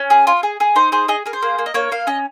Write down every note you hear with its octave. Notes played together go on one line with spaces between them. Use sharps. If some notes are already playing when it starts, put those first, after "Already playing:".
Already playing: C#4
G#4
F4
G#4
G#4
D#4 C5
G#4 C5
G#4 D#5
G#4 A#4
C5
A#3
A#3
D#5
A#3 C#5
A#3 F5
C#4 D#5